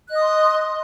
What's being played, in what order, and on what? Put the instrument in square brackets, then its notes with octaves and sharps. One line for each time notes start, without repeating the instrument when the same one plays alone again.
[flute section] F#6
D#5
D#6
C6